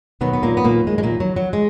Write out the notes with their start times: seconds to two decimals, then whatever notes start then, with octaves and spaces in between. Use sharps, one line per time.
0.21 D#2 B2 D#3 F#3 B3
0.33 B3
0.43 A#2 A#3
0.57 B3
0.65 A#2 A#3
0.87 G#3
0.98 G#3
1.03 A#2 A#3
1.20 F#3
1.36 F#3
1.53 G#3